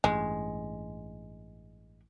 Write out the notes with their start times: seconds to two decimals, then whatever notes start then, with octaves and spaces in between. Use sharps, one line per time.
0.04 A1 G2 G#3